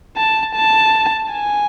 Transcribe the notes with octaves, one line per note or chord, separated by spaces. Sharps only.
A5
A5
G#5